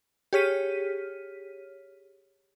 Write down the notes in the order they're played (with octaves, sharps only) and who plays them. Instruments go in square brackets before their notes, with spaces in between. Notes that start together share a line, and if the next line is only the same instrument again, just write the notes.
[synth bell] G4 G#4 C#5 F6 B6 D#7